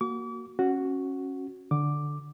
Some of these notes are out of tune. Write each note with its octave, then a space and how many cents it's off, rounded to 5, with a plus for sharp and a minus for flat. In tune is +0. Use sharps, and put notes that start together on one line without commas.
A#3 +0 F#4 +0 D6 -40
C#4 -20 F#4 +0
D3 +0 D6 +5